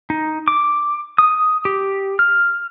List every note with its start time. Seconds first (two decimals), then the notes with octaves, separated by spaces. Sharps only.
0.10 D#4
0.48 D6
1.18 D#6
1.65 G4
2.19 F6